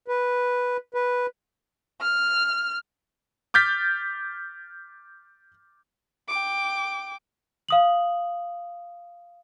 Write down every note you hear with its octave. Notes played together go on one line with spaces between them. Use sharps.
B4
B4
F6
D6 F6 G6 A6 B6
G5 D6
F5 D#6 F#7